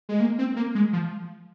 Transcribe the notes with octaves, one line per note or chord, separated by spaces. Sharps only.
G#3
A#3
C4
A#3
G#3
F3